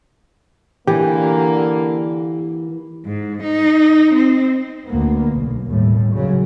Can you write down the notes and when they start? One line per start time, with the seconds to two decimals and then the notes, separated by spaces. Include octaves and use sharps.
0.87 D3 E3 A#3 G4
3.06 G#2
3.43 D#4
4.14 C4
4.87 D2 A#3 B3
5.34 B1
5.66 D#2 A2 G3
6.13 F#2 C#3 F#3